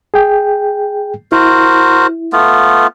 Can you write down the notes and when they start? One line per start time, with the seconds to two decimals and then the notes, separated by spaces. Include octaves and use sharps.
0.14 G#4 G5
1.32 E4 F#4 A#4 C5
2.33 A3 B3 F4